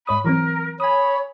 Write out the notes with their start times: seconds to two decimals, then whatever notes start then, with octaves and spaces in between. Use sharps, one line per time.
0.07 G#2 C#5 B5 D#6
0.25 E3 F#3 C4 A#4
0.80 C#5 G#5 B5 D#6